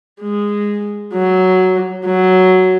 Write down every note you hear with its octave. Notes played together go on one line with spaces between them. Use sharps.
G#3
F#3
F#3